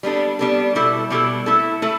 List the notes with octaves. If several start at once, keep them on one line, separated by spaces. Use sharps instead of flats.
G3 B3 D4 A4
G3 B3 D4 A4
B2 G3 E4 A4
B2 G3 E4 A4
A3 E4 A4
A3 E4 A4